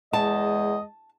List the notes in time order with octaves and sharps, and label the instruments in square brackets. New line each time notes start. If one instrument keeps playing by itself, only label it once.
[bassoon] E2 [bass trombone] G#3 [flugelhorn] D#5 [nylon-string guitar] A5